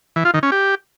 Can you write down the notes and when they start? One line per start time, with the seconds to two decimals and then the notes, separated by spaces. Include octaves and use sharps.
0.16 E3
0.25 F4
0.34 D#3
0.43 C#4
0.52 G4